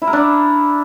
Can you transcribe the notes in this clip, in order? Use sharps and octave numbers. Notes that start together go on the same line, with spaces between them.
E4
A#4
D4